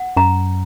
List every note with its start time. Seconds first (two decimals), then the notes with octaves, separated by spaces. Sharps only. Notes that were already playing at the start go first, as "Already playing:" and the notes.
Already playing: F#5
0.17 F#2 A#5